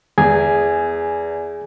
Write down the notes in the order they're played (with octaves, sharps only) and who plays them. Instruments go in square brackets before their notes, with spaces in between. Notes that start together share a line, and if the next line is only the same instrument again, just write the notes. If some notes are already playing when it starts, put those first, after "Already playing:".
[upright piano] E2 [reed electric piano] G#4 G#5